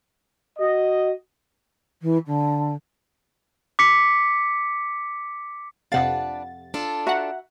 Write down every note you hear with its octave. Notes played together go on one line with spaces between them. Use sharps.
F#4 D#5
E3
D3
D6 B6 C#7
F2 C3 D4 B4 F5 F#5 A6
D4 F4 A4
F#4 E5 F#5 A#5